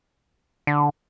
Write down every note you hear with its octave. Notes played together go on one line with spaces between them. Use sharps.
D3